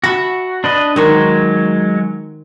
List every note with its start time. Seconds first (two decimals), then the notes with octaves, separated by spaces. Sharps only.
0.04 F#4 E5 A5 B5
0.64 D4 B4 D#5
0.96 D#3 F#3 G#3 C5 C#6